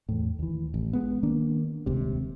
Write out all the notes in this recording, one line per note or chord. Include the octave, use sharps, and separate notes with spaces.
E2 A2
D#2 E3
A1
G#3 B3
D#3 A#3 D4
D#1 C#2 C3